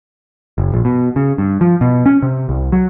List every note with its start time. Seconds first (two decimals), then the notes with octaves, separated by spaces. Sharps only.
0.58 F#1
0.74 A#1
0.85 B2
1.16 C#3
1.38 G2
1.61 F3
1.81 B2
2.06 C#4
2.22 C3
2.49 C2
2.72 F#3